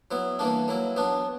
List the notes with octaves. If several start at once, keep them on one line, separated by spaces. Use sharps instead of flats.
F#3 B3 E4
E3 G3 A#3 D4
F#3 A#3 E4
F#3 B3 D4